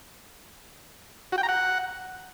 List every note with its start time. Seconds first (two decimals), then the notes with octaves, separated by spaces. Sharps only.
1.32 F#4
1.38 G5
1.43 A#5
1.49 F#5